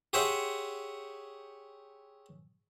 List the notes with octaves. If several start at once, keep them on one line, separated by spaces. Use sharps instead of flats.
G4 G#4 C5 C#5 E5 F#5